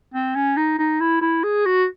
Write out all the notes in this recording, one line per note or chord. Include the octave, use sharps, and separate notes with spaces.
C4
C#4
D#4
D#4
E4
E4
G#4
F#4